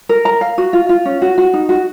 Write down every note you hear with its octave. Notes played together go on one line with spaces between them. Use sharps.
A#4
A#5
F5
F#4
F4
F4
C#4
F#4
F#4
D#4
F#4